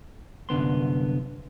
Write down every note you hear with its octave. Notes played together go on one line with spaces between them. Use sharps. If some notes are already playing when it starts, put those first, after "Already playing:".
C2 F#2 D3 B3 C6